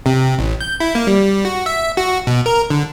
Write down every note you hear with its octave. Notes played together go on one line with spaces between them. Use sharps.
C3
A1
G6
E4
A#3
G3
F#4
E5
F#4
B2
A#4
D3